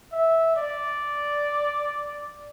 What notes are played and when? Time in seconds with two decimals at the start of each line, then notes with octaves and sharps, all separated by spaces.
0.12 E5
0.56 D5